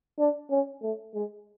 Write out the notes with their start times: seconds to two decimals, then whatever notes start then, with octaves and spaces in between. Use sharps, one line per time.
0.19 D4
0.50 C#4
0.82 A3
1.14 G#3